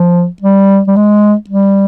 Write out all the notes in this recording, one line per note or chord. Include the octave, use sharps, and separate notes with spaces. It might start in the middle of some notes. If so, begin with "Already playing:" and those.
Already playing: F3
G3
G3
G#3
G3